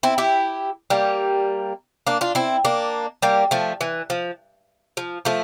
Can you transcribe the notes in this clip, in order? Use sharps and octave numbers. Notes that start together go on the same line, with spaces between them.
C4 E4
E4 G4
G3 A#3
A#3 D4
D4 F4
C4 E4
A#3 D4
G3 A#3
F3 A3
E3
F3
F3
F3 A3